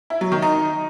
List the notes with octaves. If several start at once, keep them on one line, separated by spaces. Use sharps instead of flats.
E4
F#3
D#3
D#4